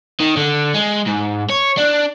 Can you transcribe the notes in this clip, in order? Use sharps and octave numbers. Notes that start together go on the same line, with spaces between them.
D#3
D3
G#3
G#2
C#5
D4